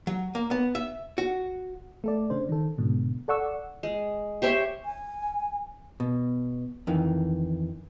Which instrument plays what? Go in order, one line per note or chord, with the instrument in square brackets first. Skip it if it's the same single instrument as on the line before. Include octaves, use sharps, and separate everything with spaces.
[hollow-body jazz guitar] F#3
A#3
B3
E5
F#4
[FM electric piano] A3 A4 D5
C#3 D4 C5
D#3 A4
G#2 B2 D3
A4 D5 F#5 C#6 E6
[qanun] G#3
G4 C5 C#5 E5
[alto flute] G#5
[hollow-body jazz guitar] B2
F2 D#3 E3